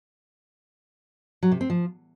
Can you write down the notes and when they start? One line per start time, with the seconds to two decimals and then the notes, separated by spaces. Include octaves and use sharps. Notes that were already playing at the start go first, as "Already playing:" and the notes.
1.43 F#3
1.52 C3
1.61 C4
1.70 F3